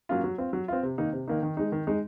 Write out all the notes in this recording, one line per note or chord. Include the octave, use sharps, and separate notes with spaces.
F#3 A#3 C#4 F4
F#3
C4 F4
F#3
C4 F4
C3
D#3 A#3 D#4
C3
D#3 A#3 D#4
D#3
G#3 D#4
D#3
G#3 D#4